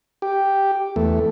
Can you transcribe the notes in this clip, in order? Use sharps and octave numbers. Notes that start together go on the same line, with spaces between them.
G4
E2 A3